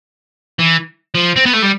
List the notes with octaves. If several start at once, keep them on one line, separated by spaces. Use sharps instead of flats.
E3
F3
C4
B3
A3
G3